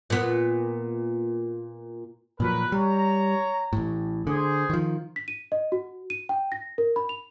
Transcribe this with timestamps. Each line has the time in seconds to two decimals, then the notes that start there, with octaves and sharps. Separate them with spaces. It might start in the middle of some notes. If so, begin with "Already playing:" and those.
0.10 A#2 B3
2.40 A#2 F3 F#3 A#4 B4
2.72 G3 C#5 A#5
3.73 A1 A2
4.27 D3 G#4 C5
4.70 D#3 F3
5.16 B6
5.28 D#7
5.52 D#5
5.72 F#4
6.10 D#7
6.29 G5
6.52 A#6
6.78 A#4
6.96 B5
7.09 F7